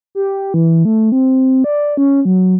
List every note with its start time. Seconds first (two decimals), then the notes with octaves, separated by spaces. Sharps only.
0.15 G4
0.54 E3
0.85 A3
1.12 C4
1.64 D5
1.97 C#4
2.25 F#3